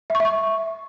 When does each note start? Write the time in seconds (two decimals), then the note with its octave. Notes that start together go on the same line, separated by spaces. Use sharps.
0.10 E5
0.15 C#6
0.20 E5
0.25 C#6